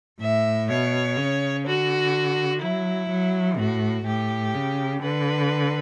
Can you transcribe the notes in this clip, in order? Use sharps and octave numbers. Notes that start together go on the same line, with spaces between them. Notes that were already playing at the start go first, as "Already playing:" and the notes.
A2 E5
B2 C#5
C#3
D3 F#4
F#3 E4
F#3
A2 F#4
A2 G4
C#3
D3 B4